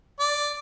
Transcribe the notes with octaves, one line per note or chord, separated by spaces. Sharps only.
D5